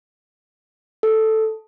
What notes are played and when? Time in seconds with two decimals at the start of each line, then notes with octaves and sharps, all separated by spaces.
1.03 A4